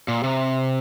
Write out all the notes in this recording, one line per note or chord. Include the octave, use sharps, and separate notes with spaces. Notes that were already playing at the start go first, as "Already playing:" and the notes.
A#2
C3